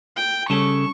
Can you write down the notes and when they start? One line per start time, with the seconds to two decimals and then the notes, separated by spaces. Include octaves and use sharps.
0.17 G5
0.50 C#3 G3 C#4 A4 C#6